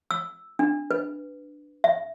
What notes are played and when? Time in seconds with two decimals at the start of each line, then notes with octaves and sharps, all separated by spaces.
0.11 E6
0.59 D4
0.91 B4
1.84 E5